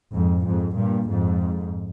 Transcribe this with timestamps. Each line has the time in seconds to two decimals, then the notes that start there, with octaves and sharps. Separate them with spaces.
0.12 F2 G#2
0.44 F2 G#2
0.76 G2 A#2
1.07 F2 G#2